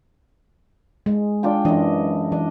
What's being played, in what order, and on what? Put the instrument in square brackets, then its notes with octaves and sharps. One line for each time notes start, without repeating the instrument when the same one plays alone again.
[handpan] G#3
[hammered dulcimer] D4 F4 G5
[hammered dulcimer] F#2 D#5 [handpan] E3 D4
[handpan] E3 [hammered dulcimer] D4 D#5